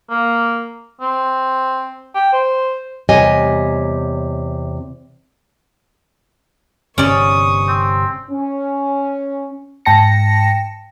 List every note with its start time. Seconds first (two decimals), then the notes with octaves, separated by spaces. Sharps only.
0.10 A#3
1.01 C4
2.15 G5
2.33 C5
3.09 E2 C3 G3 C#5 D#5 G#5
6.98 G1 C3 C#4 D5 C#6 D#6
7.68 C4
8.30 C#4
9.85 G#2 G5 A5 A#6 C#7